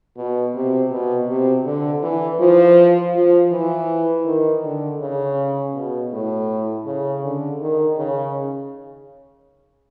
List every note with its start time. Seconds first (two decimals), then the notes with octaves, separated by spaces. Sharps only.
0.17 B2
0.55 C3
0.91 B2
1.28 C3
1.65 D3
2.03 E3
2.40 F3
3.15 F3
3.52 E3
4.25 D#3
4.64 D3
5.00 C#3
5.74 B2
6.13 A2
6.86 C#3
7.24 D3
7.60 D#3
7.98 C#3